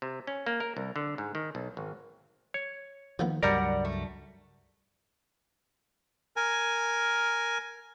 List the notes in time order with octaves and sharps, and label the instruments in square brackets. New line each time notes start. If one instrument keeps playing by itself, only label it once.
[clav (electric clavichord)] C3
C#4
A#3
A#4
C2
D3
G#2
D#3
B1
G#1
C#5
[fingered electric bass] D#3 [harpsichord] F3 A#3 B3
[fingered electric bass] C#2 G2 F#3 [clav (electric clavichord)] G3 A#4 [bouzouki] D5 F#5 A#5
[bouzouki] A3
[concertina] A#4 G#5